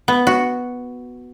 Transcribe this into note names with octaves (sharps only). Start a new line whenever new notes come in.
B3
F#4